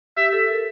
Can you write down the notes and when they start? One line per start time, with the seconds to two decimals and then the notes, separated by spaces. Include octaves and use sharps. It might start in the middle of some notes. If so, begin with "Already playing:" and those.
0.17 G4 E5
0.33 A4
0.48 A#4